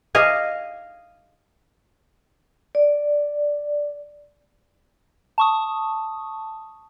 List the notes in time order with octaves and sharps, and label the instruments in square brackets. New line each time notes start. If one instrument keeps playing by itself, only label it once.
[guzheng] D#5 F5 G#5
[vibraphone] D5
[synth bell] A5 C#6 D#6